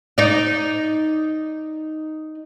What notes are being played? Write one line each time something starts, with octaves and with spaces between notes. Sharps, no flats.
D#4 D5